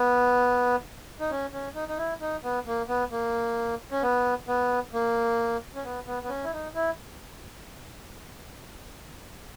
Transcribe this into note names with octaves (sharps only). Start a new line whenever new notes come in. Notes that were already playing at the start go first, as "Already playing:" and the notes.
Already playing: B3
D#4
C#4
C#4
D#4
D#4
E4
D#4
B3
A#3
B3
A#3
C#4
B3
B3
A#3
C#4
B3
B3
B3
C#4
E4
D#4
E4